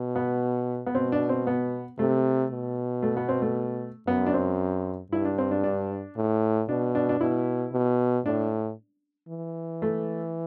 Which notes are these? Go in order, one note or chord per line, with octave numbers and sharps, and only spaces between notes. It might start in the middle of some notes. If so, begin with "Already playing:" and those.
Already playing: B2
B3
B3
B2 C4
D4
C4
B3
C3 A3
B2
A3
B3
C4
A3
F#2 B3
D4
C4
G2 E4
D4
C4
D4
D4
A2
B2 D4
D4
D4
B2 E4
B2
A2 D4
E3
A3